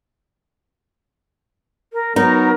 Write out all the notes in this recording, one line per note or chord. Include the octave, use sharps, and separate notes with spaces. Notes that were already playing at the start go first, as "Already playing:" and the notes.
A#4
F#3 B3 D#4 A#4